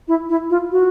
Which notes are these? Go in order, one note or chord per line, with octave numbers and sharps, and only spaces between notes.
E4
E4
F4
F#4